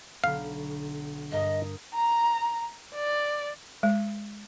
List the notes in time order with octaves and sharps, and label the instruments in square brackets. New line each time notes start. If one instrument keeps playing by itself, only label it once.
[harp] B1 D3 B5 [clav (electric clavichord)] F5
[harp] G2 A#4 D#6 [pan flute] D#5
[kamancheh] A#5
D5
[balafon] G#3